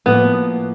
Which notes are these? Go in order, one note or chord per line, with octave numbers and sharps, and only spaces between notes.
A2 F3 A#3 B3